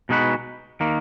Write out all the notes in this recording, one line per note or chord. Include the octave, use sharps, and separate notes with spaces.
B2 G#3 D#4 F#4 B4
D#3 A#3